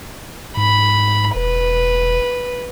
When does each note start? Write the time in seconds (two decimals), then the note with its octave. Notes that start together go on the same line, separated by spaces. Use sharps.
0.57 G#2 B5
1.35 E1 B4